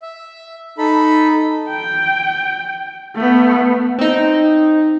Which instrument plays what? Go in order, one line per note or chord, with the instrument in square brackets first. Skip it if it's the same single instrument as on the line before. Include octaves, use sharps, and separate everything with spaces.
[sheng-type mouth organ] E5
D#4 A4 B5
[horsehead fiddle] G5
A3 B3
[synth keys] C4 D#4